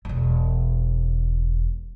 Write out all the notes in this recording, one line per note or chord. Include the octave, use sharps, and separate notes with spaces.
E1 C#4